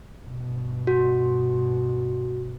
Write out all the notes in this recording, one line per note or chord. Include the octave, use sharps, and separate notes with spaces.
G2 B2
F#4